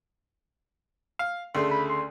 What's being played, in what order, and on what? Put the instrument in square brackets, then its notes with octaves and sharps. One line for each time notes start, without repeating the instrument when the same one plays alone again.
[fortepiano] F5
[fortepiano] D2 C#3 A3 [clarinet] C6
[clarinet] B5
C6